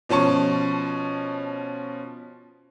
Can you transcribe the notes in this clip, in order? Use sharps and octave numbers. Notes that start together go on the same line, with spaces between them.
B2 F3 C#4 A5 C#6